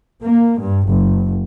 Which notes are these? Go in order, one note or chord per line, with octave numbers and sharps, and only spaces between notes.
A#3
G2
F#1